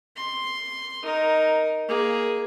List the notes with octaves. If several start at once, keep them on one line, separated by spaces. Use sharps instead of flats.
C6
D#4 A#4
A#3 G#4